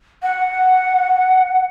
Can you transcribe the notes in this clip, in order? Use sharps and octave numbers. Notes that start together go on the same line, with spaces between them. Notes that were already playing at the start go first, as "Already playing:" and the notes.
F#5